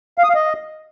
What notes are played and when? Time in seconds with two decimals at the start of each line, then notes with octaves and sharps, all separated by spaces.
0.18 F5
0.24 D#6
0.29 F5
0.35 D#5